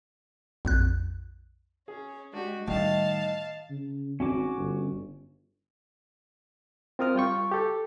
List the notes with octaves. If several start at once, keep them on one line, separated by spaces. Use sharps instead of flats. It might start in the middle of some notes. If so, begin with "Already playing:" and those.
A#1 F2 F#6
C#4 G#4
G#3 D4 F#4 G4
A2 D#3 G3 D#5 F5 A5
C#3
G#1 C#4 F#4 D6
G1
C4 F4 A#4 D#6 F6
G3 F4 G5 C#6
G4 A4